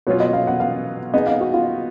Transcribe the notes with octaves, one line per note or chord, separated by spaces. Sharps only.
B2 F#3 C#4 F4 C#5
D#5
F5
F#5
F5
B3 D#4 G#4 D#5
F5
F#4
F4